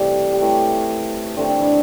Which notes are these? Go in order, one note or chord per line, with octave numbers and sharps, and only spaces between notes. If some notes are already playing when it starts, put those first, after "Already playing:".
Already playing: C3 E3 G3 A3 G4
G4
A2 E3 A3 E4
D3 A3 C4
D4
E3 E4